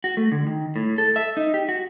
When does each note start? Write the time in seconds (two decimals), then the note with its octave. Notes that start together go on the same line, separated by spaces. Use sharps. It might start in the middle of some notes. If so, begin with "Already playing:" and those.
0.04 F#4
0.17 A3
0.32 D3
0.47 D#3
0.76 A2
0.98 A4
1.16 E5
1.37 D#4
1.54 G4
1.69 F#4